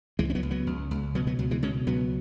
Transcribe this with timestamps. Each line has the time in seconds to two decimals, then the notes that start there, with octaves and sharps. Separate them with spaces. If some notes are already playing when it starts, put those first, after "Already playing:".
0.19 C#2 E3 G#3
0.30 C#4
0.35 F#3 B3
0.43 C#2
0.51 F#3 B3
0.67 C#2
0.91 C#2
1.15 B2 F#3 B3
1.27 F#3 B3
1.39 C#2 F#3
1.51 E3 G#3
1.63 B2 G#3 C#4
1.87 C#2 F#3 B3